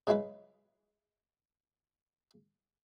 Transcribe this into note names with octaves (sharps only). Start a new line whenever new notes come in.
C#3 F#3 G#3 E4 B4